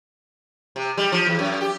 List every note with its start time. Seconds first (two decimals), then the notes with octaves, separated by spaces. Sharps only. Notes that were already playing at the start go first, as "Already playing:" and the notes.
0.76 C3
0.97 G3
1.12 F3
1.26 E2
1.39 F#2
1.61 G4